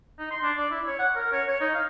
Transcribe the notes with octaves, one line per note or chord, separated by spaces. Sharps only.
D#4
C6
D4
D5
E4
C#5
F#5
A#4
C#5
C#5
D#4
F5